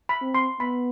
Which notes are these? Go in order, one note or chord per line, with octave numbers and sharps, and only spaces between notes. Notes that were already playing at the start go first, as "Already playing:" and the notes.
B5
C4
C6
B3 B5